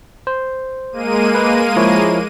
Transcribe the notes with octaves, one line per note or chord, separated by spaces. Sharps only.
C5
G#3 A#3 D#7
B4
F3 E4 C#5